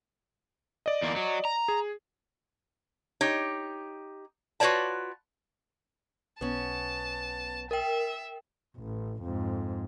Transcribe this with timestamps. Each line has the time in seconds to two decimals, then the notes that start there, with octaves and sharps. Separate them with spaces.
0.86 D5 D#5
1.02 E2 A#3
1.16 F#3
1.45 A#5
1.68 G#4
3.21 D#4 G4 C#5
4.60 F4 F#4 B4 C#5 D5 A5
6.41 B1 B3 C#4 A5
7.71 A#4 E5 G5
8.78 A1
9.23 F2 G#2